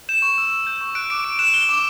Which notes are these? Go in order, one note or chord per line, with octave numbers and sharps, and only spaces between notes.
G6 E7
C#6
E6
C#6
G6
C#6
F#6 D7
D6 D7
D6 D7
F#6 E7
F#6 G7
D6